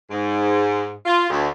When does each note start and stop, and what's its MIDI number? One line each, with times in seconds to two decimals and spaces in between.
0.10 0.92 44
1.05 1.27 65
1.30 1.47 38